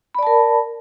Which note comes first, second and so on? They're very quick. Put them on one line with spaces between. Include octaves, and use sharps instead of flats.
B5 D5 A5 A#4